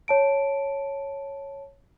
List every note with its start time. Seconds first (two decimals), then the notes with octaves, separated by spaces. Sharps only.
0.08 C#5 A5 D7